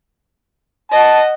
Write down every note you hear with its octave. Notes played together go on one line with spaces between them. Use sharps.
D#5 F#5 A5